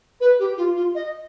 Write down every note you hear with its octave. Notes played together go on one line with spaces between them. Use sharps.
B4
G4
F4
F4
D#5